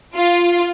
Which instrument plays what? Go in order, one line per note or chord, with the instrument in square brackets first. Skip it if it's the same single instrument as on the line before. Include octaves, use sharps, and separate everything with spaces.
[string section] F4